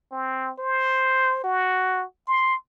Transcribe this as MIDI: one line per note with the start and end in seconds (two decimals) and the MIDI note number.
0.11 0.51 60
0.59 1.41 72
1.44 2.05 66
2.28 2.55 84